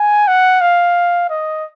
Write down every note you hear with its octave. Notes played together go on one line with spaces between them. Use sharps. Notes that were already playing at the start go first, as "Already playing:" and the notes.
Already playing: G#5
F#5
F5
D#5